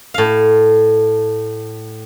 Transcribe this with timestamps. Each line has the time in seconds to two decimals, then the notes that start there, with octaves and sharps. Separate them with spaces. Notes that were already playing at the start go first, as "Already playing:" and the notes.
0.14 A2 F5